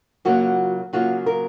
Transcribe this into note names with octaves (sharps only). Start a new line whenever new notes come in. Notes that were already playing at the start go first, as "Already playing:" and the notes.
C#3 F#3 A#3 F4 F#4
C#3 F#3 A#3 F4 F#4
A#4